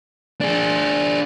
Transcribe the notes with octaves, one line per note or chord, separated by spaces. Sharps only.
D4 G#4